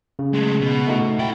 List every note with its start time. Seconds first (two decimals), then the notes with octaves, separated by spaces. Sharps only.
0.19 C#3
0.34 G#3 A3
0.61 B2
0.87 A3 D#4 F#4
1.19 E4 G5